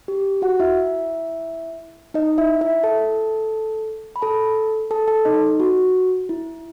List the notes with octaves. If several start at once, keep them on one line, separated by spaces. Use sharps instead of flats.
G4
F#4 F#5
E4 E5
D#4 D#5
E4 E5
E4 E5
A4 A5
B5
A4 A5
A4 A5
A4 A5
D#4 D#5
F#4
E4